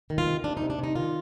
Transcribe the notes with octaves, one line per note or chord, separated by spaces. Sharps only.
D#3
F4
C3
C3 D4
D#4
C3
D4
C3 D#4
D#3 F4